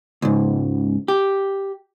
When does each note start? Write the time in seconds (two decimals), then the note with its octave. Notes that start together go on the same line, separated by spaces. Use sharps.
0.22 C#2 G#2
1.08 G4